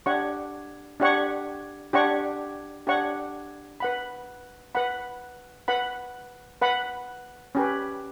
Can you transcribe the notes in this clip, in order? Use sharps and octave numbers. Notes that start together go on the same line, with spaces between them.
D4 G4 C#5 F#5 C#6
D4 G4 C#5 F#5 C#6
D4 G4 C#5 F#5 C#6
D4 G4 C#5 F#5 C#6
B4 F#5 B5
B4 F#5 B5
B4 F#5 B5
B4 F#5 B5
C#4 G4 B4